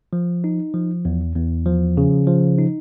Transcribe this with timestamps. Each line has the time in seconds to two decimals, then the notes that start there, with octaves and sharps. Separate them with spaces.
0.13 F3
0.44 D#4
0.74 F3
1.05 E2
1.36 E2
1.66 F3
1.97 C#3
2.27 F3
2.58 D#4